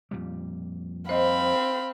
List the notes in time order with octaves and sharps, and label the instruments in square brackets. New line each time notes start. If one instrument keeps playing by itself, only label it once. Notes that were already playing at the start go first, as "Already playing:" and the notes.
[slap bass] F2 A#2 G3
[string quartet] C4 [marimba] C5 D#5 [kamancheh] F5 B5